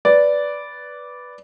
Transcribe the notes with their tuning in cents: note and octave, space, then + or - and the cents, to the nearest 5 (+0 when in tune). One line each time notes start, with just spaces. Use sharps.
B4 +0 D5 -10